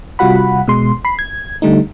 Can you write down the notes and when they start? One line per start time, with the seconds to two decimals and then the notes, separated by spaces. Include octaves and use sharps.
0.19 C3 G3 F4 F#4 F#5 B5
0.68 B2 G#3 C6
1.05 B5 C7
1.19 G#6
1.62 D3 G3 A3 D#4